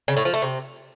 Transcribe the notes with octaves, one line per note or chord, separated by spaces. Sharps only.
C#3
A2
F3
A3
C3